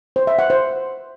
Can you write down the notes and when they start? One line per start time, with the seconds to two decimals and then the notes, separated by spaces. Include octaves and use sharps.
0.16 C5
0.27 E5
0.39 F#5
0.50 C5